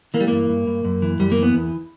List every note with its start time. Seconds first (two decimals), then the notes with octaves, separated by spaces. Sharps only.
0.14 E3 A#3
0.21 G3
0.28 G2 A#3
0.49 G2
0.67 G2
0.85 F#2
1.02 E3
1.20 F#2 G3
1.32 A#3
1.37 E3
1.43 B3
1.55 E2